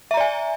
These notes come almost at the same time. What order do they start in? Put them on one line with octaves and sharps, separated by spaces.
E5 A#5 D5 G#5